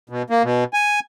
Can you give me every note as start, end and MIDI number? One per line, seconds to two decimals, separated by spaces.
0.09 0.22 47
0.30 0.43 58
0.43 0.64 47
0.73 1.00 80